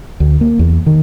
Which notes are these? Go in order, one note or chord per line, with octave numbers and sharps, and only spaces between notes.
D2
A#3
E2
D#3